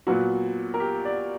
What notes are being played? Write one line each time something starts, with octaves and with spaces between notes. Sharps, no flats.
A#2 F#3 B3 F#4
A#4
G4
D5